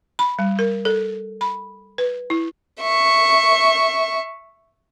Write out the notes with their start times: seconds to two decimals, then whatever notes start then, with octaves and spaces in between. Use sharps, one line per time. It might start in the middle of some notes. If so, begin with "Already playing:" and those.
0.19 B5
0.39 G3
0.59 A#4
0.85 A4
1.41 B5
1.98 B4
2.30 E4
2.82 E5 C#6